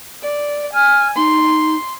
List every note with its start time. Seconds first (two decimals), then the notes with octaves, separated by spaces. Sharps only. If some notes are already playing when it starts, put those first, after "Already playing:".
0.23 D5
0.74 G#5 F6
1.16 D#4 C6